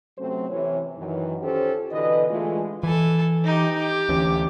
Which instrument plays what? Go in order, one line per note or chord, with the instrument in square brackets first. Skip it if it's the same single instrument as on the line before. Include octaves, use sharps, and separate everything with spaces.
[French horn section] C3 F#3 A3 C4 C#4 C5
C3 E3 C#5
F#2 D#3 E3
C#4 F4 G4 A4 C5
B2 D3 E3 B4 D#5
D3 E3 G#3 A3 F4
[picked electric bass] E3 [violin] A4 G#5
[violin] D#4 G4
G4
[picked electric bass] D2 E3 C#4